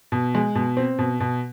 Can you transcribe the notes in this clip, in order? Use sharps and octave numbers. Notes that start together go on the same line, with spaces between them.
B2
G#3
B2
C4
B2
B2